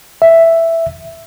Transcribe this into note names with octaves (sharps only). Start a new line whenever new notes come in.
E5